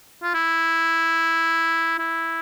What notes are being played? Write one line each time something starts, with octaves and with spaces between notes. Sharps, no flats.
F4
E4
E4